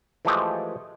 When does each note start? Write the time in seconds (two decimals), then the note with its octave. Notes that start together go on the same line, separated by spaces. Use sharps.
0.25 E3 F3 G#3 A3 G4 D#5